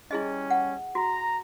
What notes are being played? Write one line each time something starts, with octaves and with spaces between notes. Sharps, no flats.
G3 C#4 E4 G#4 D#5
F#5
F#4 A#5